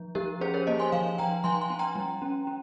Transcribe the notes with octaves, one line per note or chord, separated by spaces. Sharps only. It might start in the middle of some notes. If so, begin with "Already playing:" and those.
Already playing: F3
F3 G4 A#4
C#4 G#4 C5
A#4 C#5
A#3 C5 D#5
G#5 C6
F3 F5 G#5
F3 G5 A#5
F3 G#5 C6
G#5 C6
C#4
G5 A#5
G3
C#4
C#4